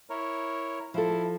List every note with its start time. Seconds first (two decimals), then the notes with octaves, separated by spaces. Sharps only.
0.10 E4 A#4 C#5
0.94 F3 E4 A4